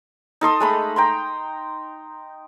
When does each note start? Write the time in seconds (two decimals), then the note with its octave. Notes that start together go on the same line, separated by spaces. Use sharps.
0.41 D#4 A4 C6 D#6
0.60 G#3 A3 B5
0.96 G5 A#5 C6